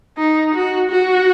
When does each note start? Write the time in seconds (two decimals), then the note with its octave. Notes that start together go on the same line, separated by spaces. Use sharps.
0.17 D#4
0.55 F#4
0.90 F#4